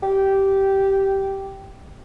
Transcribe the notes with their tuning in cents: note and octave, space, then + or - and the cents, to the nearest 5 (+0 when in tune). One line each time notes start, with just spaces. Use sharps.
G4 -10